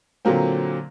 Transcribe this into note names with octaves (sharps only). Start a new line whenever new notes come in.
A#2 D3 F#3 A#3 C4